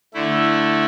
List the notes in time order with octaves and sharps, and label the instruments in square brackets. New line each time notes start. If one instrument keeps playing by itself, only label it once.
[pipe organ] D3 A3 E4